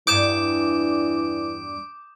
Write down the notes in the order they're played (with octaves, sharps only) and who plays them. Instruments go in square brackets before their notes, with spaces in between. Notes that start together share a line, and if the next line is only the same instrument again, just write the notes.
[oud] E2 G2 [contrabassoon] E3 [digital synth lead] D6 [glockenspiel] D#6 G6 E7